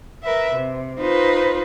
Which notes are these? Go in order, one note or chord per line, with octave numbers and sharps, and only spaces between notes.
A#4 B4 E5
C3
D#4 F4 B4 C5